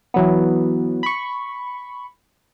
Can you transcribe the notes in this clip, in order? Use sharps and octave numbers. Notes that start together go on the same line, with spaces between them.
E3 F#3 B3
B5 C#6